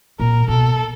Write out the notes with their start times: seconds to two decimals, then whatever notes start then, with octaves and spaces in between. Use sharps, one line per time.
0.20 A#2 A#4
0.48 B2 A4